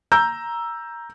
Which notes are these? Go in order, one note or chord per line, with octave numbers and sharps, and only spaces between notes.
A#5 E6 G6